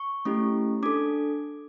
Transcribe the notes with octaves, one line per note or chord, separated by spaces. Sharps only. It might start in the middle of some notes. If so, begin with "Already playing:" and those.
Already playing: C#6
A3 C#4 E4 G4
D4 A4 D6